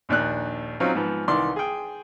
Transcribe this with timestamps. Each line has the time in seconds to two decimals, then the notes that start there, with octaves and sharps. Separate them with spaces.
0.09 A#1 D#2 D4 F#6
0.80 F#3 C4 C#4 D#4 F4
0.95 G#2 F3 B3
1.28 C2 D#3 E3 D5 C6
1.56 G#4 G5